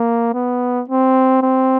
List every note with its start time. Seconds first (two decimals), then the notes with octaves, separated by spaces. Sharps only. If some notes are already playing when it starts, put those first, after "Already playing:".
Already playing: A#3
0.34 B3
0.89 C4
1.42 C4